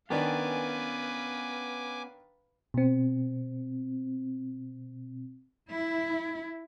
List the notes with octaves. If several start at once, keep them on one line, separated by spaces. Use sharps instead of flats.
D#3 B3 C#4 D4 B4 F5 G#5 D6
B2 C4
E4